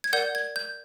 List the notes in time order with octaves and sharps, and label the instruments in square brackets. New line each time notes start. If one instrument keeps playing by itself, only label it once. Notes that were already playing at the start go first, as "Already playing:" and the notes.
[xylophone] G#6
A#4 D5 F#5 G6
G#6
G6